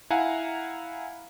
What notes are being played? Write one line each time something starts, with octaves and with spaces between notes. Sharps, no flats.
E4 F5 F#5 G#5 A#5